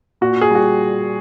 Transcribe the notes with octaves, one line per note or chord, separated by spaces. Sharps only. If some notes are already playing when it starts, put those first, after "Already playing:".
A#2 F#4
G#4
G3 F#4